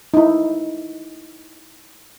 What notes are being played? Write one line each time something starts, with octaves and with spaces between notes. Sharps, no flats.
D#4 E4